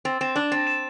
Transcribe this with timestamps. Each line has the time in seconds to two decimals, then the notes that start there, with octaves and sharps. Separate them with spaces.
0.05 C4 A6
0.21 C4 E7
0.36 D4 A6
0.52 C4 A6
0.67 E7